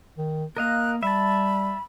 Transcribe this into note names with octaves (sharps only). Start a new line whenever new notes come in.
D#3
A#3 A#4 D#5 F5 F#6
G3 E5 A5 B5